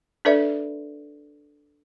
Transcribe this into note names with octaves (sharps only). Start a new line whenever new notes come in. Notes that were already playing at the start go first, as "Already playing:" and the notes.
D4 A4 B4 D5 E5